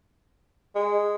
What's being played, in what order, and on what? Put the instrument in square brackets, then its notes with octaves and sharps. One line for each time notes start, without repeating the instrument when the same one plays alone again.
[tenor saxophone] G#3